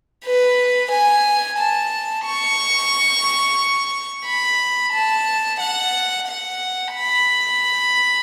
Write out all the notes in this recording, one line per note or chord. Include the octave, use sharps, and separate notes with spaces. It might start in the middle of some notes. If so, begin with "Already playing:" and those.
B4
G#5
A5
C#6
B5
A5
F#5
F#5
B5